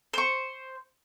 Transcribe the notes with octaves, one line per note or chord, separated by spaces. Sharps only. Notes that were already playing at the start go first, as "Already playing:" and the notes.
C5 C#6